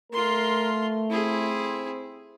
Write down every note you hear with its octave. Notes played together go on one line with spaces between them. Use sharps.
A3 F4 A#4 C6
C4 E4 G#4